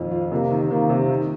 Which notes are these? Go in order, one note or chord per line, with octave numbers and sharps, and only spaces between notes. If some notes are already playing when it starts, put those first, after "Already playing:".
Already playing: F2 A#2 D#3 F4
F4
C3 A#3
D#3
D#3 A#3
C3
D#3